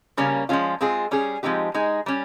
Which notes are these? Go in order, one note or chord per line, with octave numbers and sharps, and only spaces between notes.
C#3 G3 A#3 C#4
F3 G#3 C#4 F4
G#3 C4 F4 G#4
G3 C#4 G#4
F3 G#3 C4 D#4 G4
G#3 D#4 G#4
G3 C#4